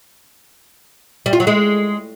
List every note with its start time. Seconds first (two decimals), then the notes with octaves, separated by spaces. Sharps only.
1.26 G3
1.33 F4
1.40 F#3
1.47 G#3